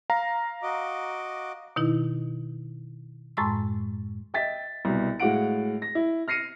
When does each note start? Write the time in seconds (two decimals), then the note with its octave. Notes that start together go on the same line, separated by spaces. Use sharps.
0.10 F5 A#5
0.63 F#4 D#5 D6
1.76 B2 D#3 D#4 E4
3.37 F#2 A2 G#3 A5 C6 E6
4.34 D#5 E5 G5 A6 B6
4.85 C2 B2
5.20 A2 G#3 F#4 F5 F#5 D7
5.82 A#6
5.95 E4
6.28 F6 A#6 C7 C#7 D#7